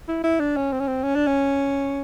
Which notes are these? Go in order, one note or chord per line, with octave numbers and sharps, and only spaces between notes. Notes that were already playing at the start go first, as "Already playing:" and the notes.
E4
E4
D4
C#4
C4
C#4
C4
C#4
D4
C#4